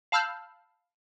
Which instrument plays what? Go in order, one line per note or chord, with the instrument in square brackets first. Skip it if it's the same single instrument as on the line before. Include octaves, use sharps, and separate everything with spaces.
[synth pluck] F5 A5 B5 E6 F6 G6